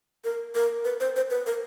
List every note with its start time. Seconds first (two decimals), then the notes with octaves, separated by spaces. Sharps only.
0.24 A#4
0.55 A#4
0.85 B4
1.00 C5
1.16 C5
1.30 B4
1.46 A#4